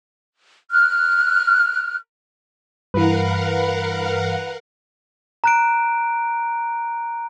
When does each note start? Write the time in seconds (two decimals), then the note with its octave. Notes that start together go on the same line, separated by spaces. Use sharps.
0.71 F6 F#6
2.94 G2 E3 A#4 B4 F5 F#5
5.44 A#5 F#6 D7